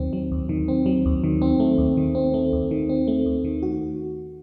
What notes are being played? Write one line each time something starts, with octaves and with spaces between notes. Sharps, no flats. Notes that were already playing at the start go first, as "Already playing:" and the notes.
Already playing: D#2 D#3 F#3 C4
F#3
D#2
D#3
C4
F#3
D#2
D#3
C4
A3
D#2
D#3
C4
A3
D#2
D#3
C4
A3
D#2
D#3
F#4